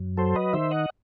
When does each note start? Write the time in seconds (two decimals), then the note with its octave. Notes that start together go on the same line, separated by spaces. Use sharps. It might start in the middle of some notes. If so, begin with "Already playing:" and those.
Already playing: F#2
0.17 F#3 A4 C5
0.35 B4 D#5
0.53 D#3 C5 E5
0.71 D#5 F#5